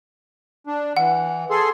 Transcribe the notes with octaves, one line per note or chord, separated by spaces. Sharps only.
D4
E3 F#5
G#4 A4 C6